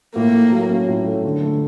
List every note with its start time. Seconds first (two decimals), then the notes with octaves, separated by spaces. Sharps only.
0.15 A2 A#3
0.33 A3
0.52 F#3
0.69 C#4
0.88 A2
1.06 A3
1.24 D3
1.42 A3